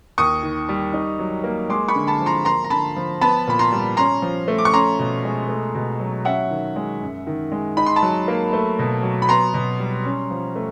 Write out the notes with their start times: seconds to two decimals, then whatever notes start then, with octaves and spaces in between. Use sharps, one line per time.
0.18 D#2 C#6 D#6
0.43 D#3
0.69 G3
0.93 D#4
1.19 F#3
1.44 A#3
1.69 G#3 C6 D6
1.88 B5 C#6
1.95 D3
2.07 A5 B5
2.21 F3
2.26 A#5 C6
2.45 A#3 A#5 C6
2.64 A#5
2.70 D3 A5 B5
2.97 F3
3.21 B3 A5 B5
3.47 A#2 B5
3.59 A#5 C6
3.72 G3
3.97 C#4 A#5 C6
4.22 F3
4.48 A3
4.58 D6
4.65 C#6
4.74 C#4 A#5 C6
4.99 B2
5.25 G#3
5.49 A3
5.75 B2
6.00 F#3
6.25 C#4 E5 F#5
6.50 D#3
6.76 G#3
7.02 F#2
7.27 D#3
7.52 G#3
7.77 D#4 B5
7.86 C6
7.96 A5 B5
8.02 F#3
8.28 A#3
8.53 A3
8.79 B2
9.03 F#3
9.22 B5
9.29 B3 A#5 C6
9.54 B2
9.80 G3
10.05 C#4
10.31 F3
10.56 A3